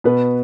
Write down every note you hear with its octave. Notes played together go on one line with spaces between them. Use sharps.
B2 B3 B4